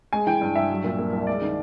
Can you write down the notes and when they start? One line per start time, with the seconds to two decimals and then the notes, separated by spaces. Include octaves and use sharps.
0.13 G#3 G#5
0.27 E3 G5
0.41 G2
0.56 G2 E5
0.70 F#3
0.84 A#2
0.98 A#3
1.13 C2
1.27 G#3 D5
1.42 D#3